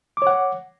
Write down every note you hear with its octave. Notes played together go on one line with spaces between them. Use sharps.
C#5 F#5 D6